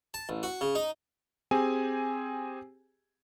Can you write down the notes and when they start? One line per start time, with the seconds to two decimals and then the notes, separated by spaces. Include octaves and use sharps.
0.14 A5
0.29 A1
0.43 F#4
0.61 C#3
0.75 D#4
1.51 C4 G4 G#4 G#5